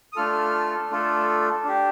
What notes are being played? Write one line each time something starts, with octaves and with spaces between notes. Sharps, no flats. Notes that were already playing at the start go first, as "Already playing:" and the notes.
D#6
A3 D4 F4 A4 F6
A3 D4 F4 A4
D4 G4